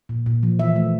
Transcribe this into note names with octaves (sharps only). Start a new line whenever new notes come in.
A#2
A#2
F3
E3 E5
A3